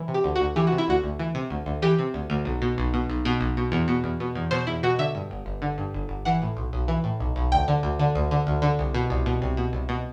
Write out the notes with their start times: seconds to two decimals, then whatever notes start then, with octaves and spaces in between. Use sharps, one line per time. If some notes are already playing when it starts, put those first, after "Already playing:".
Already playing: E3
0.08 C3
0.14 G4
0.24 D2
0.36 D2 F#4
0.56 E3 G4
0.67 F#4
0.72 C3
0.78 E4
0.88 D2 F#4
1.04 D2
1.19 E3
1.35 C3
1.50 D2
1.66 D2
1.82 E3 G4
1.99 C3
2.14 D2
2.30 D2
2.45 B1
2.62 B2
2.78 B1
2.94 B2
3.10 B1
3.25 B2
3.41 B1
3.57 B2
3.72 E2
3.88 B2
4.04 E2
4.20 B2
4.35 E2
4.51 B2 C5
4.67 E2 E4
4.83 B2 F#4
4.99 D3 E5
5.15 G2
5.31 G1
5.46 G1
5.62 D3
5.78 G2
5.94 G1
6.09 G1
6.25 E3 F#5
6.42 A2
6.57 B1
6.73 B1
6.88 E3
7.04 A2
7.20 B1
7.36 B1
7.52 D2 G5
7.68 D3
7.83 D2
7.99 D3
8.15 D2
8.31 D3
8.47 D2
8.62 D3
8.79 C2
8.94 B2
9.10 C2
9.26 B2
9.42 C2
9.57 B2
9.73 C2
9.89 B2